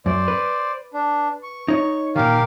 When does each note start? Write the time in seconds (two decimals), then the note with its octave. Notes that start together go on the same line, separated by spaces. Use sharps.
0.06 F#2 C5 D5
0.28 B4
0.94 D4
1.43 C#6
1.68 D#4 C#5
2.16 A#2 D#3 G4 A#4 F5